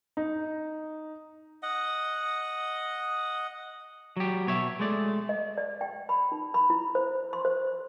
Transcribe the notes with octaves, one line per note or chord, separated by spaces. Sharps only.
D#4
D#5 F#5
F#3 G4
B2 C#5 E5
G#3 A3 D5
D#5
D5
G5
B5
D#4
B5
E4
C5
C6
C5